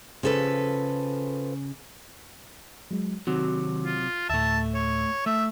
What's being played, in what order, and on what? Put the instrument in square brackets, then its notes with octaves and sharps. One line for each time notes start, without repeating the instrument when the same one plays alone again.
[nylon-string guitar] C#3 [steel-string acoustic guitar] F3 A4 B4
[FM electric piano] F#3 G#3
[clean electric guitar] C3 F#3 [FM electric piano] D#3 C4 F#4
[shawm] F4
[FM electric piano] D2 A2 [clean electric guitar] A3 E5 [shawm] A5
[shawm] C#5
[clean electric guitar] A3 [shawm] E5